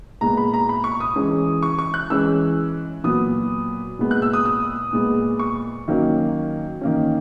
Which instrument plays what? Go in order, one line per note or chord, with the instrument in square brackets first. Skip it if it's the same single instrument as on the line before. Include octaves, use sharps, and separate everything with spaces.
[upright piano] A#2 G#3 B3 A#5
B5
A#5
B5
C#6
D#6
E3 G#3 C#4
C#6
C#6
F#6
E3 G#3 C#4 E6
A#2 F#3 B3 D#6
A#2 G#3 B3
F#6
E6
D#6
D#6
A#2 G#3 B3
C#6
D#3 F#3 A#3 C#4
D#3 A#3 C#4